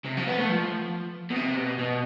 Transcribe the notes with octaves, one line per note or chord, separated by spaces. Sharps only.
C3
F3
B3
A3
F3
B2
C3
B2
B2